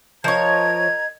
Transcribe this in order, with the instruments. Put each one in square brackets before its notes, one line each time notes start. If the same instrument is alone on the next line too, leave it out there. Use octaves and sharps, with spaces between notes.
[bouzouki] F3 C#5 [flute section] A#4 A#5 G#6 [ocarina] D#5